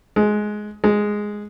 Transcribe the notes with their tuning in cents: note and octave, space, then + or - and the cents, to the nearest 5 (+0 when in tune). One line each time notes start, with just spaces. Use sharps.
G#3 +15
G#3 +0